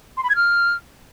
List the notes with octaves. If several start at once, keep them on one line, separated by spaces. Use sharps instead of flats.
C6
B5
G#6
F6